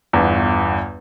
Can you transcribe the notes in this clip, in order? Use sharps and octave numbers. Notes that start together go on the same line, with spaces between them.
G1 E2